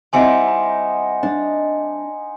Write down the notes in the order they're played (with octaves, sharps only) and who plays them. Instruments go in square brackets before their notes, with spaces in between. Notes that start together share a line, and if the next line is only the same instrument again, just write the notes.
[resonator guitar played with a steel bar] G3 C4 E4 [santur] D#4 F#5 [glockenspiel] G#5 C6 C#7
[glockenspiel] A#5
[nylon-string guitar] D4